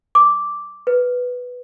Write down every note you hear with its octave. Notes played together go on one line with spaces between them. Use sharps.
D6
B4